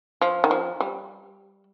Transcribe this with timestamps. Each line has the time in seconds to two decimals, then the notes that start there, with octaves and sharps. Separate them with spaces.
0.21 F3
0.44 D#3
0.51 F3
0.80 G3